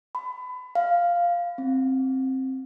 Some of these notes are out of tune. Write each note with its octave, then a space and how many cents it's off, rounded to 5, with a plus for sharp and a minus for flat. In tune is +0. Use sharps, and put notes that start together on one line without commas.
B5 +30
F5 -5
C4 +10